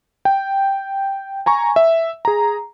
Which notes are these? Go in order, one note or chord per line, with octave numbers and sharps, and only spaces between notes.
G5
G#5 A#5 C#6
E5
G#4 A#5